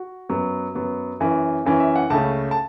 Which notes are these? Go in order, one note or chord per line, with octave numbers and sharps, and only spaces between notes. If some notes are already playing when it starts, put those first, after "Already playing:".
Already playing: F#4
F#2 F#3 B3
F#2 F#3 B3
F#2 E3 C#4
F#2 E3 C#4
E5
F#5
C#2 C#3 A3 C#4 A5
A5